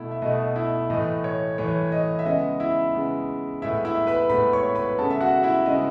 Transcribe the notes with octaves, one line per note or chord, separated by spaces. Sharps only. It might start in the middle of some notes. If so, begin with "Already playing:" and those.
Already playing: B2 A3 E4 E5
E5
B2 A3 D#5
E4 E5
A2 E3 A3 D#5
C#5
A2 E3 A3 C#5
D#5
E5
C#3 G#3 B3 D#5
E4 E5
C#3 G#3 B3
A2 G#3 B3 E4 E5
E4 E5
B4 B5
A2 G#3 B3 B4 B5
C#5 C#6
B4 B5
C#3 G#3 B3 A4 A5
E5
F#4 F#5
E4 E5
C#3 G#3 B3 D#5